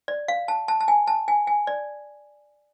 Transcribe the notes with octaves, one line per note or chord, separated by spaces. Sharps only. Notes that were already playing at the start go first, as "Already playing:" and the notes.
D5
F5
A5
A5
A5
G#5
A5
G#5
G#5
D5